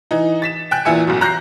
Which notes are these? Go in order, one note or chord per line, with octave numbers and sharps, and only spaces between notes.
E3 D#4
A6 B6 E7
G5 G#5 F#6
E2 A#2 E3 E5 G#5 C#7
B1 F#2 B2
A#5 F#6 G6 A#6 C7